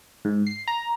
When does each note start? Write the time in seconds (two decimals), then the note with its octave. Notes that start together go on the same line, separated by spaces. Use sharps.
0.25 G#2
0.47 C7
0.67 A#5